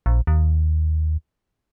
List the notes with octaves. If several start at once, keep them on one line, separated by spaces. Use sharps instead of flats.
A#1
D#2